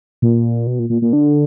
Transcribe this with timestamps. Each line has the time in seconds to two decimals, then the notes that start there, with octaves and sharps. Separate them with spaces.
0.22 A#2
0.67 B2
0.79 A#2
0.90 A#2
1.02 A#2
1.13 D3